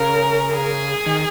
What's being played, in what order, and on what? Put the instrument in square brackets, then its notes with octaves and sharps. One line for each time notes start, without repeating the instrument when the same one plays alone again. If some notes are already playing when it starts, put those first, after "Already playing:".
Already playing: [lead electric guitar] C#3 [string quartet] A#4
[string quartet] G#4
[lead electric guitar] D#3